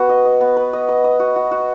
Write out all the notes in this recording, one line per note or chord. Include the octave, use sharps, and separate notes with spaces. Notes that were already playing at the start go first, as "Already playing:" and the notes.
Already playing: B3 F#4
D#5
D#5
B3
B4
D#5
D#5
D#5
F#4
F#4
F#4